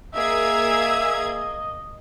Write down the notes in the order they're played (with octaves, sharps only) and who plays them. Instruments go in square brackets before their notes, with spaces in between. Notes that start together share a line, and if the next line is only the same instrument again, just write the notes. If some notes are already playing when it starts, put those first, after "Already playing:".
[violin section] A#3 G#4 G#6 [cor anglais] D#5 [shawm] E5